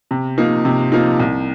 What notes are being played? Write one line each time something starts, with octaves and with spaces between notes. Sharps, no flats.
C3
F3 A#3 D#4
C3
F3 A#3 D#4
C2